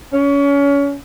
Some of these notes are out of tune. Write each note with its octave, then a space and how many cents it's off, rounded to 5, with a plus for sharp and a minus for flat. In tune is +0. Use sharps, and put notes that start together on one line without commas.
C#4 +30